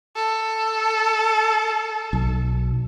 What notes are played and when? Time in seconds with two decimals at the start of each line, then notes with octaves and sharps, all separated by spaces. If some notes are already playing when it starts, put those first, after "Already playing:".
0.16 A4
2.13 B1